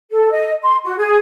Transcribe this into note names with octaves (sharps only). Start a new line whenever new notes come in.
A4
D#5
C6
F#4
G#4